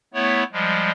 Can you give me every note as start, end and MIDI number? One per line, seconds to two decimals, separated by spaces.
0.14 0.43 57
0.14 0.43 59
0.14 0.43 64
0.14 0.43 73
0.53 0.91 53
0.53 0.91 55
0.53 0.91 56